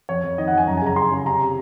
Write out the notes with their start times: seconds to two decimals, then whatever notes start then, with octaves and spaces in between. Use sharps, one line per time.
0.09 F2 C#5
0.23 F2
0.38 D#3 D#5
0.48 F#5
0.53 F2 G#5
0.67 F#2 A#5
0.77 G#5
0.82 C#3 A#5
0.96 C#3 C6
1.11 C#3
1.26 C3 A#5
1.41 C3